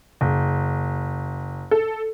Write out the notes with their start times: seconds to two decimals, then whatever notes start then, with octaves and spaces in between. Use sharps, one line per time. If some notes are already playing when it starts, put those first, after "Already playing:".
0.21 F#1
1.71 A4